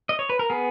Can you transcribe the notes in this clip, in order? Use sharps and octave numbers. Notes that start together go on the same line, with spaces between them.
D#5
C#5
B4
A#4
B3 G#4